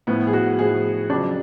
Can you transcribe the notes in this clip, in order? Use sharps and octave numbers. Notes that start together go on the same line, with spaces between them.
A2 F3 B3
G#4
F#4
A2 F3 G#4
F2 C#3 F#3 D4